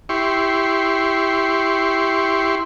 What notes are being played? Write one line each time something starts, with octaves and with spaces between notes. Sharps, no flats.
E4 G4 C6 C#6